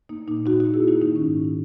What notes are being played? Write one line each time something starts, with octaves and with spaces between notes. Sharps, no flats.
A#3 D#4
A#2 D#4
A#2 D#4 F#4
D#4 F#4
A#3
E4 G#4
A#3 D#4 F#4
D#3 D#4
C#4
G#2
A#3
D#4